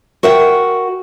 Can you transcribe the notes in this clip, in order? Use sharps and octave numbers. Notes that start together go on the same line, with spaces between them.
F#4 A#4 E5 F#5 G5